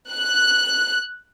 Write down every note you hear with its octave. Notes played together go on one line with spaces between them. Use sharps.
F#6